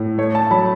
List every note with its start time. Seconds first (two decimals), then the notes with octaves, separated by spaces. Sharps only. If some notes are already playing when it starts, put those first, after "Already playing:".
Already playing: A2
0.18 A3 C#5
0.35 A5
0.51 F#3 B5